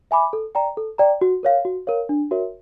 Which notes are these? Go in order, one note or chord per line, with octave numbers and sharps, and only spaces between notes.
E5 G#5 B5 D6
A4
D5 G5 A#5
A4
D5 G5 A#5
F#4
A#4 C#5 F5
F#4
A#4 C#5 F5
D4
F#4 A#4 C#5 E5